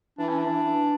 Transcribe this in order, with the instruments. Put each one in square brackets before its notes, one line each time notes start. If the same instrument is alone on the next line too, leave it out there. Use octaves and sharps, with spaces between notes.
[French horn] E3 [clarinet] D4
[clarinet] C#4
D4
[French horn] E3